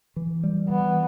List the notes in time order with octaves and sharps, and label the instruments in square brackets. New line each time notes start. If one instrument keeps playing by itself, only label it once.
[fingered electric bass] E3
G3
[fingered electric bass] E3 [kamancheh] B3